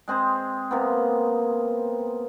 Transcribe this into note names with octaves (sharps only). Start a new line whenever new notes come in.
G#3 C4 G#4 C5
C3 A#3 B3